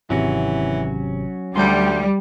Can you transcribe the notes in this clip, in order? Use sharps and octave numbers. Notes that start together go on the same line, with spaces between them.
G#1 C3 E3 F#3 C#4 F#4
D2 G3 C6 G6